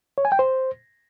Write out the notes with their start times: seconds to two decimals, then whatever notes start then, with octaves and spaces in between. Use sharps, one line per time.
0.18 C#5
0.25 G#5
0.32 G5
0.39 C5